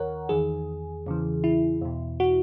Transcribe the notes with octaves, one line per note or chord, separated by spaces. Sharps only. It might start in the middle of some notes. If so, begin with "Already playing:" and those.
Already playing: D#2 D#3 A#4 C#5 F#5
E2 D#3 G#4
E2 C#3 E3
E4
E2 B2
F#4